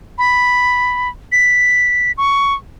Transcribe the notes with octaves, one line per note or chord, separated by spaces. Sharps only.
B5
B6
C#6